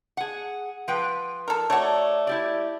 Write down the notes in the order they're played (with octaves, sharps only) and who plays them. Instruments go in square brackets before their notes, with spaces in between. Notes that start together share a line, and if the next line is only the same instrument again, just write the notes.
[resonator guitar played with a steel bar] G#4 F#5
F3 B4 G5
[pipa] A4 A#4
[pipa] A3 F#4 [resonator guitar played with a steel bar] C#5 D5
[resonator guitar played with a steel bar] E4 G4 D5